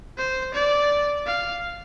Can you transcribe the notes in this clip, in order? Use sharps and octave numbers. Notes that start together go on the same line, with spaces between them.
C5
D5
F5